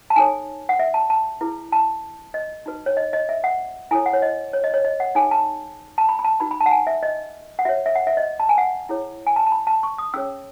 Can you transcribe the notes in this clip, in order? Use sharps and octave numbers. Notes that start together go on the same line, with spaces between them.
A5
D#4 A4 C#5 G#5
F#5
E5
A5
A5
E4 G#4 B4
A5
D#5
D#4 F#4 B4
C#5
D#5
D#5
E5
F#5
E4 A4 C#5 G#5
F#5
C#5
D#5
C#5
D#5
C#5
D#5
F#5
D#4 G#4 C#5 G#5
A5
A5
B5
B5
A5
D#4 F#4 B4 B5
B5
A5
F#5
G#5
E5
D#5
F#5
F#4 C#5 E5
E5
F#5
E5
D#5
A5
G#5
F#5
E4 G#4 C#5
G#5
A5
A5
B5
A5
C#6
D#6
C#4 G#4 C#5 E6